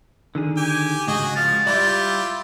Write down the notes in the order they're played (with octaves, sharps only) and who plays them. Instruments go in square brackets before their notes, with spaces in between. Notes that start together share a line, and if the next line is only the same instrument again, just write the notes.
[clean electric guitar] D3 D#3 G#4
[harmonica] G4 G#5
[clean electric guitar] C#2 G#2 [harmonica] F#4 G#4 D#5
[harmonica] F3 F5 [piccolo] A6
[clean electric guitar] G3 D5 [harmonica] E4 F4 G4